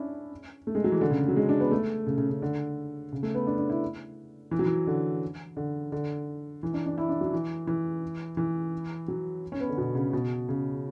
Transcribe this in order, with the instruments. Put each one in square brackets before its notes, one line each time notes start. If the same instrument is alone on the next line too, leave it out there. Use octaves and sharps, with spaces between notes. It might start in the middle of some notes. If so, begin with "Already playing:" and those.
Already playing: [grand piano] C#4 D4 E4
A3
G#3
F#3
E3
D3
C#3
F#3
G#3
D4
B3
A3
C#3
C#3
C#3
D3
C#3
A3
B3
D4
D4
E4
E3
F#3
E3
D3
D3
D3
E3
D4
D4
E4
D4
F#3
E3
E3
E3
F#3
C#4
B3
D3
B2
C#3
B2
C#3